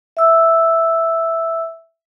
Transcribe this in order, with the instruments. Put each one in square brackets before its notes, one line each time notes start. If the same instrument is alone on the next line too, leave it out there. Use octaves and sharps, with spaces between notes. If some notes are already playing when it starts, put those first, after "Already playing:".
[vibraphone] E5 E6